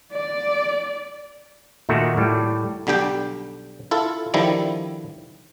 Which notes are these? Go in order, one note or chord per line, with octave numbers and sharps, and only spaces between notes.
D5
A#2 D#3 A3 F#4
A2 G3
B1 D3 G3 G4 G5
E4 F4 A4
D3 D#3 F3 G3 E4